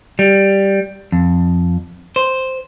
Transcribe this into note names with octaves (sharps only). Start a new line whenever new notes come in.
G3
F2
C5